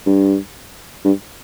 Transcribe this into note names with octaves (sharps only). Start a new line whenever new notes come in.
G2
G2